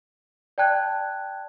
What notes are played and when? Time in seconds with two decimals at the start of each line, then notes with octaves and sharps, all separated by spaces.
0.58 D5 G5 A5 F#6 G#6